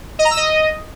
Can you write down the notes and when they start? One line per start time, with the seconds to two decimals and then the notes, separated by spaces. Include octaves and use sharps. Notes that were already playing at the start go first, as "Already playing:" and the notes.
0.19 D#5
0.25 A#5
0.31 E6
0.37 D#5